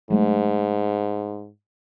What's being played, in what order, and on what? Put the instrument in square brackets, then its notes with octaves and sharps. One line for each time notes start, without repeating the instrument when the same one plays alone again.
[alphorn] G#2 [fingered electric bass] F#3 G#3 A3